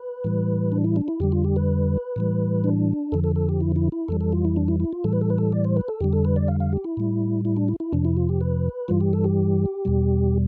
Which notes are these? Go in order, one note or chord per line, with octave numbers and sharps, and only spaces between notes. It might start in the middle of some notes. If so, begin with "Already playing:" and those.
Already playing: B4
A2 E3 G3
D4
E4
D4
E4
F2 D3 G3 G4
F4
G4
B4
A2 E3 G3
D4
F2 D3 F3 A4
A4
A4
G4
E4
E4
E4
F2 E3 G3 A4
A4
F4
E4
D4
E4
E4
F4
A2 E3 G3 A4
B4
A4
B4
A4
D5
C5
B4
A4
F2 D3 G3 G4
A4
B4
D5
F5
F5
G4
E4
A2 G3
E4
D4
E4
E4
F2 C3 F3 D4
E4
F4
G4
B4
G2 E3 G3 F4
G4
A4
G4
E2 B2 G3